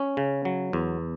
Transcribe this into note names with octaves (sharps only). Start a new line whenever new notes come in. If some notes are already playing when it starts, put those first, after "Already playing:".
Already playing: C#4
C#3
F#3
E2